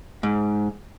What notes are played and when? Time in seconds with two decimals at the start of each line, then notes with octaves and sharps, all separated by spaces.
0.23 G#2